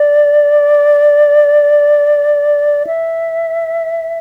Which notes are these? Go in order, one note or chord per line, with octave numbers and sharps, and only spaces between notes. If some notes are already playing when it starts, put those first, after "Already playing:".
Already playing: D5
E5